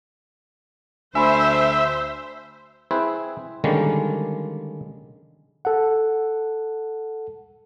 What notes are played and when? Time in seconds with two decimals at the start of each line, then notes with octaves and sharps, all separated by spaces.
1.15 D2 C5 E5 G#5 B5 C6
2.91 C4 E4 G#4 B4 C5
3.64 D3 D#3 G3 G#3 A#3 C#4
5.65 A4 F#5